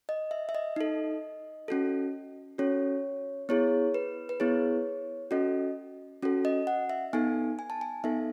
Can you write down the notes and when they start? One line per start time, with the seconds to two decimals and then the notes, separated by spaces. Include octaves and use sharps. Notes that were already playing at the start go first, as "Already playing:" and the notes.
0.09 D#5
0.31 E5
0.49 E5
0.55 D#5
0.76 D#4 A4
1.68 C#4 F#4 A4
2.58 C#4 F#4 A4 C#5
3.49 B3 E4 G#4 C#5
3.94 B4
4.29 B4
4.40 B3 E4 G#4 C#5
5.31 C#4 F#4 A4 D#5
6.22 C#4 F#4 A4
6.45 D#5
6.67 F#5
6.90 E5
7.13 B3 D#4 A4 G#5
7.59 G#5
7.70 A5
7.81 G#5
8.04 B3 D#4 A4 E5